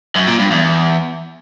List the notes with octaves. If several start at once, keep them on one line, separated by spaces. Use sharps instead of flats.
F#2
A#2
G2
E2